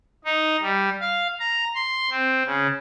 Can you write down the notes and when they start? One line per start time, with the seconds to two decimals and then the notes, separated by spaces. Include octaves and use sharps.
0.25 D#4
0.61 G3
1.01 F5
1.40 A#5
1.75 C6
2.11 C4
2.46 C#3